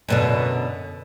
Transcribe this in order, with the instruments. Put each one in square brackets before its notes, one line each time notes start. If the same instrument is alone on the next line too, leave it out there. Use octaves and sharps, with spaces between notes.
[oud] F#2 B2 D3